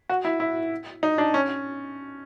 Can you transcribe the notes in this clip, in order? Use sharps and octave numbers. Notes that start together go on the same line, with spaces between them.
F#4
E4
E4
D#4
D4
C#4